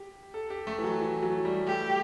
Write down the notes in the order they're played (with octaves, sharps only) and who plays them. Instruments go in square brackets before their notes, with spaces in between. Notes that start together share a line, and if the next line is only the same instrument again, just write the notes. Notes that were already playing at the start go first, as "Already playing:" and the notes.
Already playing: [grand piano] G4
A4
G4
A3
E3
F#3
E3
F#3
G3
[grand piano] A3 [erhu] G4